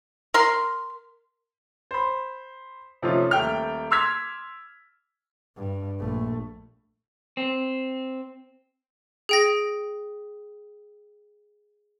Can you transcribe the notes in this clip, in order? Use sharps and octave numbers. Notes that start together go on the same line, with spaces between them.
A#4 C6
C5 B5
C3 F3 A3 C#4 D#4 F4
D#1 A3 G5 F6
C6 D6 E6 F6 G#6 B6
G2
A#1 A3
C4
G#4 G5 A#6